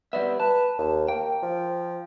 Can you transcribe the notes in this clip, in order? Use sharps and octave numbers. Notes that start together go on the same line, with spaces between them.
G3 B3 D5 E5
B4 A5
D#2
A#3 G5
F3